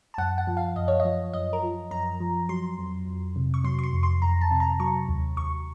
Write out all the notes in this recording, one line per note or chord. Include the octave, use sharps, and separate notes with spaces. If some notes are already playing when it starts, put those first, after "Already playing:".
A5
F#2 F#5
F#5
F3
F5
F#2 D#5
C#5
D#5
F3
F#2 D#5
A#4
F3
F#2 A#5
F3
F#3 C6
F2
F2
C3
C#6
F#3 C6
C#6
C6
F2
C6
F2 A#5
A5
C3
A#5
F#3 C#6
D#2
D#2 C#6